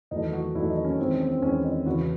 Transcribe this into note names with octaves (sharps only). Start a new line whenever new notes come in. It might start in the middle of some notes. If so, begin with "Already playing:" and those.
E2 D#3 F#3 A3 D#4
F#4
E2 D#3 F#3 A3 E4
D#4
C#4
E2 D#3 G#3 C4
C#4
C4
E2 D#3 G#3 C#4
D#4
E2 C#3 E3 F#4